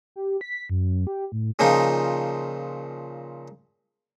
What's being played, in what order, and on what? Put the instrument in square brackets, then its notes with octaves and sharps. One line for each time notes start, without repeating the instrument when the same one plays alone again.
[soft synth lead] G4
B6
F#2
G4
A2
[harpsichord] A#2 C#3 F3 D#4